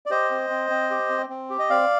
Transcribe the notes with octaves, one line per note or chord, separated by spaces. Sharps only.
D5
G4 C5 D#5
C4
C4
C4
G4
C4
C4
G4
D#5
C4 D5 F5